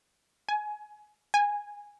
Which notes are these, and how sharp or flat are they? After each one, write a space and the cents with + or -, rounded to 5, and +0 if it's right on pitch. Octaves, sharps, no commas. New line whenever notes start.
G#5 +20
G#5 -10